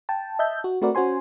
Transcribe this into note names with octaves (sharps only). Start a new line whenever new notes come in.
G5 A5
D#5 E5 A5 G6
F#4
A3 C4 F#4 A#4 B4 D5
C#4 F#4 C5 G#5 C6